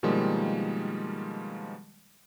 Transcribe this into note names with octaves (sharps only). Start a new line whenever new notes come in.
B2 D#3 F3 G3 G#3 A#3